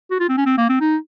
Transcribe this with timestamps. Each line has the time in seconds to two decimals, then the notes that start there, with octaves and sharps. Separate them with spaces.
0.11 F#4
0.20 F4
0.29 C4
0.37 C#4
0.46 C4
0.58 A#3
0.69 C4
0.81 D#4